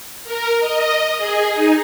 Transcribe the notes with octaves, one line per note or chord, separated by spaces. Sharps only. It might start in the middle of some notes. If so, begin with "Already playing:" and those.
A#4
D#5
G#4
D#4